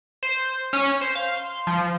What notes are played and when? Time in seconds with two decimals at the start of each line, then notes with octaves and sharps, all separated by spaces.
0.23 C5
0.73 C#4
1.01 C5
1.15 F5
1.38 C6
1.67 F3